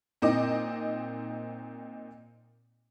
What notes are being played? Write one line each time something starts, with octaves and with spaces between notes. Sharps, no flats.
A#2 C4 D#4 D#5 D6